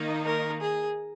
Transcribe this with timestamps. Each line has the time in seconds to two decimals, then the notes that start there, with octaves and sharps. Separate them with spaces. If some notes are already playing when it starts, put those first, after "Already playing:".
Already playing: D#3 A#3 D#4
0.26 A#4
0.61 G#4